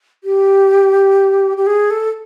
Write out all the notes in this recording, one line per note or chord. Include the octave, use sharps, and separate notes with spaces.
G4
G4
G#4
A4